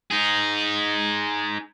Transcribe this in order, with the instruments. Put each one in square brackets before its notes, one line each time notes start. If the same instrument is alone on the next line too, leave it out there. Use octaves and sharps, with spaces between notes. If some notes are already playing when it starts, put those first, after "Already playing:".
[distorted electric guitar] D#4 G#4